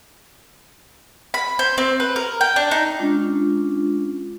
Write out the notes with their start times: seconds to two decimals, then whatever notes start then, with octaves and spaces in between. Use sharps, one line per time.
1.34 B5
1.59 C5
1.78 C4
2.00 B4
2.16 A#4
2.41 G5
2.56 D4
2.71 D#4
2.99 G#3 C#4 D4 F4